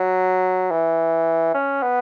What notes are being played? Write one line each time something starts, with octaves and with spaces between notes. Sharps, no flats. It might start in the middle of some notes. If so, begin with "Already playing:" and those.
Already playing: F#3
E3
C#4
B3